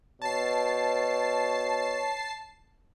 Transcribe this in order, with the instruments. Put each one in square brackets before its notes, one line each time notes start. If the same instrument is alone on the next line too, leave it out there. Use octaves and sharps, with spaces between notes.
[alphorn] B2 [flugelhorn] C#5 [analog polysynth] A5 C7